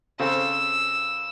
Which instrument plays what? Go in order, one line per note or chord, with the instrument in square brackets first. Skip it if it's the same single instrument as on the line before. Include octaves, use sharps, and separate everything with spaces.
[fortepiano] C#3 C4 A4 [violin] E6